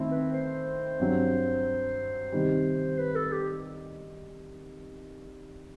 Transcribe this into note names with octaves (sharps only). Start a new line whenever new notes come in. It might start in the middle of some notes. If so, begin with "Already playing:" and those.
Already playing: D#3 A3 C4 E4
B4
C5
G2 F#3 C4
C3 D#3 G3
B4
A4
G4